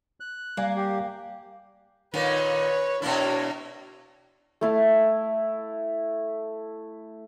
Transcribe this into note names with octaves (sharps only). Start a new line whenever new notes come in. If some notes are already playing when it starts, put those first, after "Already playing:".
F#6
G3 A#3 D5 G#5
G4
A#2 D#3 B4 C#5
B2 A#3 D4 E4 C#5
A3 E4 F5